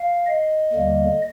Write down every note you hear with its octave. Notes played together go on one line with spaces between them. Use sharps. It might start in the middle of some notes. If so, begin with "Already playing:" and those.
Already playing: F5
D#5
D#2 D3 G3 A#3